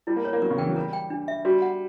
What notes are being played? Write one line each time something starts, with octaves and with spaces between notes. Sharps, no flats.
G3 E4
A#3
G3 C#5
A#3
F#3 A#4
C#3
E3 G5
F#3
G3 A#4
G5
D4
E5
G3 F#4
F#5